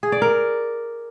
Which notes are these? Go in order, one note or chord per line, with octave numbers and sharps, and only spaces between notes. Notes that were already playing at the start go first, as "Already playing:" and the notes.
G#4
D5
A#4